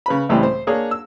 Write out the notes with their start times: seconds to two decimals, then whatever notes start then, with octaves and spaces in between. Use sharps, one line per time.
0.06 C#3 B4 B5
0.29 C#2 A2 E3 G3 C4
0.43 C5
0.67 A#3 D4 G#4 C#5
0.91 E6